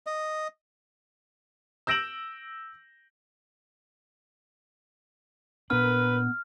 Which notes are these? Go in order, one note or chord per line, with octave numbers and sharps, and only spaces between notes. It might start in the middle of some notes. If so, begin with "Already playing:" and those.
D#5
E6 G6 A#6 D7 E7 F#7
A#2 B3 D4 A#4 B4 F6